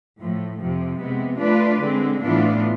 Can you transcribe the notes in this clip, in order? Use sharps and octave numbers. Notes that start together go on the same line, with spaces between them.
A2 F3 A3
F2 C3 F3
C3 G#3 B3
A3 D4 F4 B4 D5
D3 G#3 C4
A2 E3 B3 D4 F4